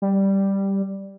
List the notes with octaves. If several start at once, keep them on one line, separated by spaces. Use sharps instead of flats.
G3